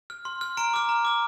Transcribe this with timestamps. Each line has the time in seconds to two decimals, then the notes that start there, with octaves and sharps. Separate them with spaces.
0.10 F6
0.25 C6
0.41 F6
0.57 A#5 D7
0.74 D6 F6
0.89 A#5
1.05 D6 F6